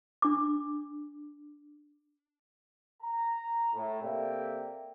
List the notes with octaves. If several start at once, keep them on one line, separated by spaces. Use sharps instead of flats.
D4 D6
A#5
A2
C3 A#3 A4 D5 E5 G5